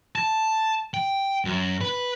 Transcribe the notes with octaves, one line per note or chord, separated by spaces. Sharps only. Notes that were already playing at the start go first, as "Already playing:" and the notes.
A5
G5
F#2
B4